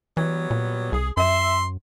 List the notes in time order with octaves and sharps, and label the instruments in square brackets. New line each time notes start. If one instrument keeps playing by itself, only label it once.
[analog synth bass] E3 [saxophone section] F#3 G3 B3
[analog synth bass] A#2
[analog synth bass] C2 [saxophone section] G#4
[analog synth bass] F#2 [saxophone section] E5 [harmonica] C6